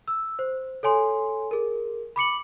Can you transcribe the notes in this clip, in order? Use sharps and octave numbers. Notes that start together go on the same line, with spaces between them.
E6
C5
A4 C#5 G#5 C6
G#4 A#4
B5 D6 C#7 F#7